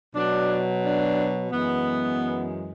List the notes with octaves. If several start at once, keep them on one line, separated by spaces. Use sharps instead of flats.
B2 F#3 D4
D4
F#2 E3 G#3 B3